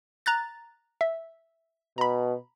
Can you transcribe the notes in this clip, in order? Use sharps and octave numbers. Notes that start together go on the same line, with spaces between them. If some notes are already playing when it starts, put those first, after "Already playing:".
A#5 F#6 A6
E5
B2 A#5 B5